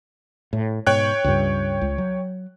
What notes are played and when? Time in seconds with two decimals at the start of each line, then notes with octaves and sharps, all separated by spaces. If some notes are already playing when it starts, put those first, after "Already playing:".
0.53 A2
0.87 G#2 B2 C#5 G5 F#6
1.24 C#2 G2
1.81 C#2
1.98 F#3